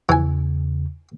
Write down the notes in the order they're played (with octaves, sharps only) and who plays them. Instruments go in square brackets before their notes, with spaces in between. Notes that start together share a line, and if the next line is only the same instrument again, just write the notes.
[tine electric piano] E2 C#3 [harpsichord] E3 G#5